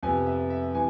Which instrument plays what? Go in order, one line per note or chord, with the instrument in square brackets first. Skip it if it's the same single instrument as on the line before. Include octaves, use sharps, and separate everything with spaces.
[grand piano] F2 C3 F3 B3 G#5
E5
E5
C3 E3 G#5